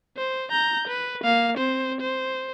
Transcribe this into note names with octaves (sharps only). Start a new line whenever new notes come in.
C5
A#5 G6
B4
A#3 F5
C4 C5
C5